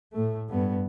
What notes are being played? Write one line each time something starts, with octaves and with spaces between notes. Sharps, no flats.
A2 A3
G2 B3